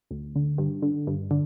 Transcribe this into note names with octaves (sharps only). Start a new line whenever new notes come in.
D2
D3
G2
D3
G2
D3